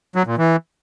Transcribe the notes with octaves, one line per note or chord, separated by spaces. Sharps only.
F#3
A#2
E3